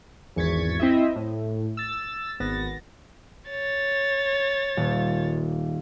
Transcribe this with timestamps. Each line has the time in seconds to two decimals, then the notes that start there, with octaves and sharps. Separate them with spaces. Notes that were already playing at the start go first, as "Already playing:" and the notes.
0.36 G#1 E2 C#6 G#6 A6 B6
0.80 C4 E4 D#5 E5
1.16 A2
1.77 E6 A6
2.40 G#1 B3 A6 A#6
3.50 C#5 A6
4.77 D#1